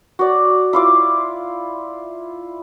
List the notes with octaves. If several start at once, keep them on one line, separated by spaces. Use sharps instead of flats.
F#4 D5
E4 F4 D6